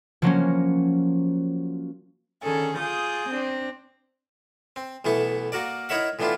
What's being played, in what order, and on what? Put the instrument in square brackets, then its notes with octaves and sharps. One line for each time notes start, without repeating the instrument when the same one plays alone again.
[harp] F3 F#3 A#3 C#4
[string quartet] D3 D#3 C#4 G#4 A4
F4 G#4 D6 D#6 G6
C4 D4
[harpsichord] C4
B1 E3 A3 B3 E4 C#6
A#3 F#4 A#4 D5
D#4 E4 A#4 C#5 E5 F#5
A2 E3 B3 D4 E4 F4